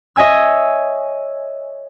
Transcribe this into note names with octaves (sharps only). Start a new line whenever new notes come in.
C#5 D#5 E5 G#5 E6